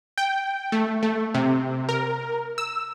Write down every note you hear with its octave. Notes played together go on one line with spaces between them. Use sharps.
G5
A3
A3
C3
A#4
E6